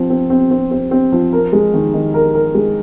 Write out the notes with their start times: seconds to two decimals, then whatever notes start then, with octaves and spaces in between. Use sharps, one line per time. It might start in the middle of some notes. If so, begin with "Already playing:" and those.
Already playing: F3 C4
0.10 C4
0.30 C4
0.51 C4
0.71 C4
0.91 C4
1.12 F3
1.33 A#4
1.53 G#3
1.74 D#3
1.94 D#3
2.14 A#4
2.34 A#4
2.55 G#3